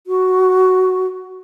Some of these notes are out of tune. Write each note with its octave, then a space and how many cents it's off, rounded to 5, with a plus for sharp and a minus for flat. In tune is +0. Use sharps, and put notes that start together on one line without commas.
F#4 +5